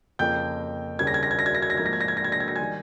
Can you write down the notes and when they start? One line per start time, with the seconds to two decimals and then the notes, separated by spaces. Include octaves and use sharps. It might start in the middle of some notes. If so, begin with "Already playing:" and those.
0.19 F2 C#3 F3 A#3 G5 G6
0.99 D#2 C#3 G3 A#3 G#6
1.07 A#6
1.14 G#6
1.23 A#6
1.31 G#6
1.39 A#6
1.46 G#6
1.55 A#6
1.62 G#6
1.70 A#6
1.77 G#2 F3 A#3 G#6
1.86 A#6
1.93 G#6
2.01 A#6
2.08 G#6
2.17 A#6
2.24 G#6
2.32 A#6
2.40 G#6
2.48 A#6
2.56 D#3 G3 G#5 G#6